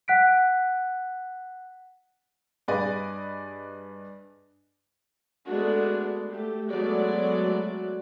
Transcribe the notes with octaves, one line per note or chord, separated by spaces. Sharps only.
F#5 F#6 B6 D7
G2 G#4 B4 D5 D#5 G#5
G#3 A3 B3 D4 F#4
A3 G4
F#3 G#3 A3 B3 F#4 D5